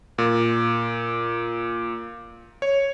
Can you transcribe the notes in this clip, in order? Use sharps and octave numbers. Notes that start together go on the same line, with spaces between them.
A#2
C#5